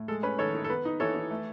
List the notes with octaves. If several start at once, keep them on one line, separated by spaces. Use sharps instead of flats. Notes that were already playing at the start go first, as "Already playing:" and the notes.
Already playing: A2
G#3 A4
C#4 B4
D#3 A4 C#5
D#3
A4
B3 B4
D#4
E3 A4 C#5
E3
A3